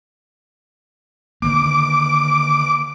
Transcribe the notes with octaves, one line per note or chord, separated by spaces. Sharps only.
D3 D#3 A#3 D6